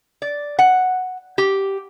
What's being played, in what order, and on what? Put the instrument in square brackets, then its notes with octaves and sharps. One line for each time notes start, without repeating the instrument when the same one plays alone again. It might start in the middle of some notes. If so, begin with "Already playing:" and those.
[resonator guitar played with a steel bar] D5
F#5
G4